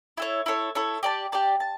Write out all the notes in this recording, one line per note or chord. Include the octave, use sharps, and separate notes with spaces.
E4 A4 C#5
E4 A4 C#5
E4 A4 C#5
G4 D5 A5
G4 D5 A5
A5